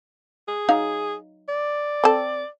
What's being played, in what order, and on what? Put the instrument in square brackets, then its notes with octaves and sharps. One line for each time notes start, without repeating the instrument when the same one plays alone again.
[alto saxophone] G#4
[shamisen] F#3 D#4 F5
[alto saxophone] D5
[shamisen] C4 A4